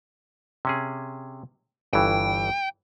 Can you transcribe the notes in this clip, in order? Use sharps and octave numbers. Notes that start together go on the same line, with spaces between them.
C3 C#4 G#4
G1 G2 E3 G5